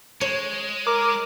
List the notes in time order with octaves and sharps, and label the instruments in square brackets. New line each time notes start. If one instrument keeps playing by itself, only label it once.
[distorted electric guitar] G#3 [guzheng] C#5
[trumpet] A#4 [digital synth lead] D6